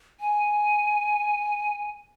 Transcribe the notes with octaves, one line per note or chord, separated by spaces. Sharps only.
G#5